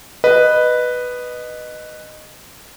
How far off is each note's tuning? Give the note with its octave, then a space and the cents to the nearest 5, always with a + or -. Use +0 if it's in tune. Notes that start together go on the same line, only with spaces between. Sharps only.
B4 +0 D#5 -15